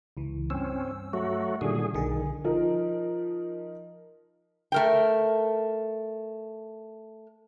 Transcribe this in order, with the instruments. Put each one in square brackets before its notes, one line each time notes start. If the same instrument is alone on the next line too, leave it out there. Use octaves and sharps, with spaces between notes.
[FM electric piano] C#2 E3
[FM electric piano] G2 E6 [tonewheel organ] C4 C#4
[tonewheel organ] F#3 A3 F#4
[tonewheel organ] A#2 D3 G#4 [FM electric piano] D#3 G3
[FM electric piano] B1 D3 G#4 [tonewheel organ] D#3
[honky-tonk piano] F3 D#4 A#4
[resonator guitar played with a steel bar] A3 A#4 G5